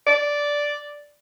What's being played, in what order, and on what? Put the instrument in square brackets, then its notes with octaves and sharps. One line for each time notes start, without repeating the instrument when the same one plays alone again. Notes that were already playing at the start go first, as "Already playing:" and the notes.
[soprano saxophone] D5